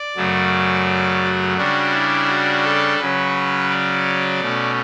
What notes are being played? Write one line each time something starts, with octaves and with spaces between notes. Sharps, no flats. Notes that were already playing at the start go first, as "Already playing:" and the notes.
Already playing: D5
F#2 C#3 F#3 A3
F#4
C#3 G3 D4 F#4
E4
F#4
A4
C#3 F#3 C#4 B4
D5
B2 A3 C#4